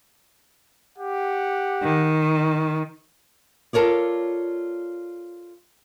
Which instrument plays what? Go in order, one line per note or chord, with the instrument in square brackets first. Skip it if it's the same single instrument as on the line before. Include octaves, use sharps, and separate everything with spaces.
[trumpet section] G4 F#5
[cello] D#3
[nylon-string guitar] F4 A4 A#4 C#5 D5